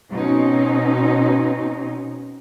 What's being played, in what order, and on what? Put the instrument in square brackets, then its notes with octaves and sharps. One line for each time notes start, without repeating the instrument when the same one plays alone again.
[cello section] B2 C4 C#4 D#4